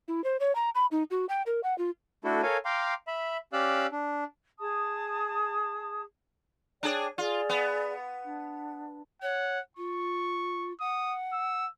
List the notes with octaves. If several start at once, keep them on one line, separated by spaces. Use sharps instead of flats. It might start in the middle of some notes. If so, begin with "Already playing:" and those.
E4
C5
C#5
A#5
B5
D#4
F#4
G5
A#4
F#5
F4
A3 D4 E4 F#4 A4
A4 A#4 C#5 F5 G#5
F5 G5 A#5 C6 D6
E5 B5
C#4 G4 D5 F5 E6 F#6
D4
G#4 A5 D#6
D4 G#4 C#5 D5 G5
F4 G#4 D5
B3
D4
C#5 F#5
F4 C#6
F#5 D#6
E6